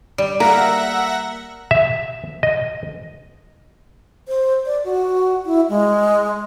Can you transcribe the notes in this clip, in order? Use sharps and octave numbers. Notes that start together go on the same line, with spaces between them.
G3
A#3 A#4 E5 F#5 A#6
E5
D#5
C5
D5
F#4
E4
G#3